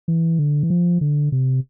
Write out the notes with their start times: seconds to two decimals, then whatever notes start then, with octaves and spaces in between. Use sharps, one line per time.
0.08 E3
0.39 D3
0.63 E3
0.70 F3
1.01 D3
1.32 C3